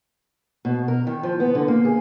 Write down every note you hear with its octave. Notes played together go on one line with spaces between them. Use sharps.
B2
A#4
D#3
F3
B3
D3
A#3
G#4